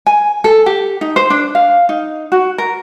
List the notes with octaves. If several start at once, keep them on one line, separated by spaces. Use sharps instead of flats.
G#5
A4
G4
D#4
C5
D4
F5
D#4
F#4
A#4